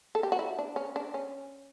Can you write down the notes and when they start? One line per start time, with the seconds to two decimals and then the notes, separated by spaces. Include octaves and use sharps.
0.15 A4
0.23 G4
0.32 F#4
0.39 E4
0.59 D4
0.76 C#4
0.96 D4
1.14 C#4